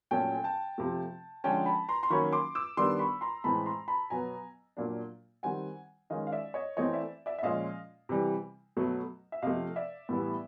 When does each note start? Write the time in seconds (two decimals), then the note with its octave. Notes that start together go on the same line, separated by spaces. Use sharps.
0.11 A#2 F#3 A3 C#4 G5 A5
0.34 G#5
0.44 G5 A5
0.78 C3 F3 A3
1.44 D3 F3 G#3 C#4 G5 A5
1.66 A5 B5
1.89 A#5 C6
2.03 C6
2.10 D#3 F#3 A#3 C#4 B5 C#6
2.33 C6 D6
2.55 D6 E6
2.77 D#3 G3 B3 D4 C6 D6
2.99 B5 C#6
3.21 A#5 C6
3.44 A2 E3 G#3 C4 A5 B5
3.66 A#5 C6
3.88 A5 B5
4.10 B2 F#3 B3 G#5 A#5
4.77 A#2 F#3 A#3 D4
5.43 D#3 G3 C4 F#5 G#5
6.10 D#3 G#3 C#4 D#5 F5
6.27 F5
6.32 D5 E5
6.54 C#5 D#5
6.77 E3 A3 C4 C#5 D#5
6.93 D5 E5
7.26 D5 E5
7.38 E5
7.43 A#2 F3 G#3 C#4 D#5 F5
8.09 C3 E3 G3
8.77 B2 F#3 A3
9.32 E5
9.42 C3 F3 A3 D#5 F5
9.76 D5 E5
10.09 A2 E3 G3 B3